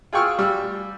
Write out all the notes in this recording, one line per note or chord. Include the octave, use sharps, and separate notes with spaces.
F4 G#4 G5 C#6 E6 F6
G3 E6